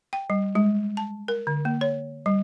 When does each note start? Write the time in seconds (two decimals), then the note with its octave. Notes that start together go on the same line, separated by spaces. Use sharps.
0.13 G5
0.30 G3
0.55 G#3
0.97 A5
1.28 A#4
1.47 D3
1.65 A#3
1.81 C#5
2.26 G3